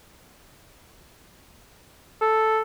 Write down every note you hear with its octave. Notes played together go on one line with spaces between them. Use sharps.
A4